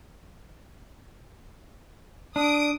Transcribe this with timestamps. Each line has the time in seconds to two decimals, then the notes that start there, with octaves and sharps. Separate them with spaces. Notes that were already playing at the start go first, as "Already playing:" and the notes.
2.36 D4 D#6 D7